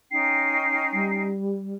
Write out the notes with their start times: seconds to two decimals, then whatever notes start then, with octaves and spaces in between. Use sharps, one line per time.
0.11 C#4 D#4 G5 C7
0.93 G3